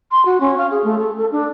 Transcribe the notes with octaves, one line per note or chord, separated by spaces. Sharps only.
C6
F#4
C#4
F5
G#4
A3
A4
A4
D4